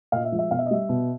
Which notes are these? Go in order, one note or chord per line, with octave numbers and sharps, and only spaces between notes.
A#2 D#5 F5
E5
F3 G#3
E5
B2 F5
E5
D#5
G3 E5
B2